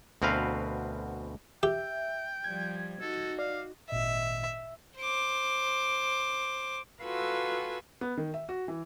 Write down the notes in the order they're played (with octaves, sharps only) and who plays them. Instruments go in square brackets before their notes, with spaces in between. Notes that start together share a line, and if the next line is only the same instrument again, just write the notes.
[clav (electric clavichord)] D2 B2 C4 A#4 B4 F5
[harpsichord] G4 [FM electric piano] E5 [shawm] G5
[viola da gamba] F3 G3 [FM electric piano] G#6
[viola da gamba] D#4 F#4 [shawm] A4
[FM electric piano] D5 [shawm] F5
[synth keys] G#1 A#2 D#5 [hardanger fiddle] E5
[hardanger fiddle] C5 D6
[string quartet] F4 F#4 A4 B4 G#5 E6
[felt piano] B3
D#3
E5
F#4
E3